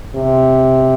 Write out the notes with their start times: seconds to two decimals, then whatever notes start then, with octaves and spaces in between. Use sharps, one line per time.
0.15 C3